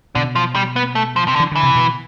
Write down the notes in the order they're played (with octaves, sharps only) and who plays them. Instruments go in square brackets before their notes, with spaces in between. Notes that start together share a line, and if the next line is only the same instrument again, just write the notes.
[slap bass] B2 [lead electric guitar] D3
[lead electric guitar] F3
G3
B3
A3
F3
C3
D3
[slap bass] E3
[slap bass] D3 [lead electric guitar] E3
[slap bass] C3
B2